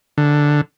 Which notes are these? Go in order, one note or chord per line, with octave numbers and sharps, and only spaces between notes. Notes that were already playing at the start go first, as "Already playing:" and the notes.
D3